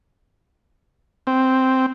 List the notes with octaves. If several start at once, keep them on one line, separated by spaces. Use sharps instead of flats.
C4